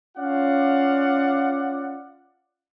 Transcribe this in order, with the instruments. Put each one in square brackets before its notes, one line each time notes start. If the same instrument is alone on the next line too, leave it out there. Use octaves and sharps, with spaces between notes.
[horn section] C#4 F4 D5 F5 F#5